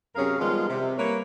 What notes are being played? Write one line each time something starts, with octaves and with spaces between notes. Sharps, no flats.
F#2 C3 C#4 G#4 A#4 F5
D#3 F3 G3 G#3 B3 F4
C3
G3 A#3 B4 C#5